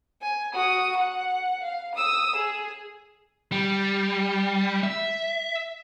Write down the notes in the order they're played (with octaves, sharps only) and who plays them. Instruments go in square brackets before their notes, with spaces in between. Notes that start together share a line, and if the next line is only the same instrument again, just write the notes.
[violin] G#5
F#4 D#6
F#5
F5
D#6 E6
G#4
[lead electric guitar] G3
E5